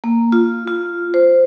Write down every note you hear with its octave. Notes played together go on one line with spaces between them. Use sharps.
A#3
F4
F4
C5